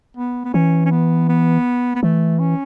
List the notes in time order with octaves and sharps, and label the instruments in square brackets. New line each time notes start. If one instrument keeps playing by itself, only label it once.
[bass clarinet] B3
B3
[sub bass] E3 [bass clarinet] C#4
[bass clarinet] C#4
B3
B3
B3
[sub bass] E3 [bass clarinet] A3
[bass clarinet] C#4